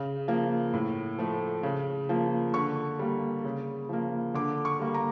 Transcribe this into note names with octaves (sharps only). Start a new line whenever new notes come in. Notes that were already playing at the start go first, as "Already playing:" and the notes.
Already playing: C#3
F3 A#3
A2
F3 A3
C#3
F3 A#3
D3 C#6
G3 A#3
C#3
F3 A#3
D3 D6
C#6
G3 A#3
A#5